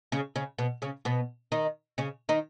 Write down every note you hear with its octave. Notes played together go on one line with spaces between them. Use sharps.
C#3 C#4
C#3 C#4
B2 B3
C#3 C#4
B2 B3
D#3 D#4
C#3 C#4
D#3 D#4